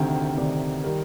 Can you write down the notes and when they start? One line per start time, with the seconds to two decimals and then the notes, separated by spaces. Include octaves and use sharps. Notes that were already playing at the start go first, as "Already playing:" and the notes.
Already playing: D2 C3 D#3 G5
0.15 G5
0.37 D2 C3 D#3 D5
0.83 D#3 G3 A#4